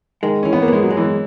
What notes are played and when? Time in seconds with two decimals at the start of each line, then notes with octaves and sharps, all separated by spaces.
0.23 D#3 G#3
0.43 E3 C#4
0.53 B3
0.62 A#3
0.68 G#3 B3
0.83 F#3
0.90 G#3
0.97 E3